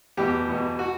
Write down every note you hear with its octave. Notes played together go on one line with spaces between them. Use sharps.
E2 B2 G4
E2 B2
F#4